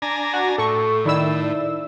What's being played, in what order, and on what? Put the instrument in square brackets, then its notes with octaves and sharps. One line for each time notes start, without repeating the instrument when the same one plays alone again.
[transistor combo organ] D4 G#5 A#5
[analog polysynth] F#4
[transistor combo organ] A2 [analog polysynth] A4 C#6
[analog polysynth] D#3 E4 E6 [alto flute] D5